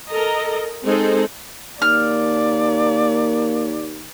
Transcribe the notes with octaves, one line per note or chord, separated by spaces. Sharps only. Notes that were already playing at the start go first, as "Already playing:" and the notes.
A4 A#4 D#5 A#5
G#3 C4 D#4 G#4 A4 C5
D#2 A#3 D5 F6